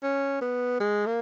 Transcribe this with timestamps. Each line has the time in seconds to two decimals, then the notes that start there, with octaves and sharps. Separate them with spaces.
0.03 C#4
0.41 B3
0.80 G#3
1.06 A#3